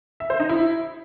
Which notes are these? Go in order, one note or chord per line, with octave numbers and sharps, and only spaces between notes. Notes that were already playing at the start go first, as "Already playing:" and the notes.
E5
C5
D#4
E4